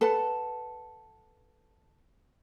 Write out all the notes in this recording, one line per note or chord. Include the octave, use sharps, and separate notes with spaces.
A4 B4 F#5 A5